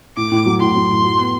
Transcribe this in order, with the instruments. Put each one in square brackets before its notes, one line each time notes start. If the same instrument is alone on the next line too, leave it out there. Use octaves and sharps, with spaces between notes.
[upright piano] A2 [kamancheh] D6
[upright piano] A2
F#3
[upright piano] A2 [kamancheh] C6
[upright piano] F#3
A2
F#4
B3